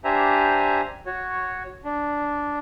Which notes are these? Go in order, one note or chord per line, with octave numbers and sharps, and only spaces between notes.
D4 G4 C5 E5 G#5 A#5
F#4 C#5
D4